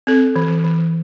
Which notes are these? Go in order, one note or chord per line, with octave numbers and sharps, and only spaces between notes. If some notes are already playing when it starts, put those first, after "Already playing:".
C4 A4
E3
E3